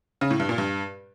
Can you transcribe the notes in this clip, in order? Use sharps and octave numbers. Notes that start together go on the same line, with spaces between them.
C#3
A2
G2
A#2
G2